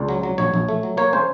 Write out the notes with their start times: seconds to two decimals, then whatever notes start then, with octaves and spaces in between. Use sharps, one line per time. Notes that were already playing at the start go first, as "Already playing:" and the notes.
Already playing: C#2 D5
0.09 F#3
0.23 F#3
0.38 A#1 C#5
0.54 A#1
0.68 A3
0.83 F#3
0.97 A#3 C#5
1.13 C#4 C5